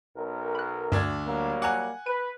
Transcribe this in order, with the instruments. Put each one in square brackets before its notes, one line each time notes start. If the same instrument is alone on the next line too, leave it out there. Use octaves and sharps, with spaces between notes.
[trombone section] B1 A#4
[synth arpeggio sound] B5 F#6
[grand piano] D2 D4 G#6 [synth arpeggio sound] G2
[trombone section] F#3 G3 A#3
[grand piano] F#5 G#5 F#6 [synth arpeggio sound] A#5 D6
[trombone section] B4 [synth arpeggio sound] D#7